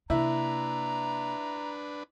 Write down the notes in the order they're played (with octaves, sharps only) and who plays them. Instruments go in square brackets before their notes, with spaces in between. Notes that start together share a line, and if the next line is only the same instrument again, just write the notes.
[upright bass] C3 A#3 [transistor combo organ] D4 B4 [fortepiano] E4 [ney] A#5